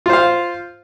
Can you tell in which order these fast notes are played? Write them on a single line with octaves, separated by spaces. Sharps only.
F4 C5 F5